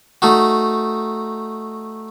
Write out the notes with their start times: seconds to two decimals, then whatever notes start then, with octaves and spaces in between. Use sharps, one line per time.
0.22 A3 D#4 F#4